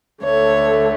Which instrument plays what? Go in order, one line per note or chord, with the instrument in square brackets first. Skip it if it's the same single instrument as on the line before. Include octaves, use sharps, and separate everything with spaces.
[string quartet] D2 D3 A3 C#5